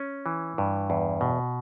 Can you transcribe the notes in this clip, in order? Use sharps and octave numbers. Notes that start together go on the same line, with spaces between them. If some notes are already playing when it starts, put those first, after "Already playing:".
Already playing: C#4
E3
G2
E2
B2